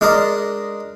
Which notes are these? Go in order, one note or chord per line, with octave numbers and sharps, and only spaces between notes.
G#3 D4 A#4 D5 D#5